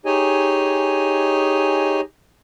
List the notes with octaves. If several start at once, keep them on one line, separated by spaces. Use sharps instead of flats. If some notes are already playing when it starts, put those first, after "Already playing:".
D#4 G4 G#4 C#5 D#5 G#5